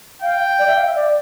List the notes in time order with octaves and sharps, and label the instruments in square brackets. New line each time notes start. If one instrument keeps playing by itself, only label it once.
[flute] F5 [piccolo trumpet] G5
[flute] D5
E5
F5
E5
D5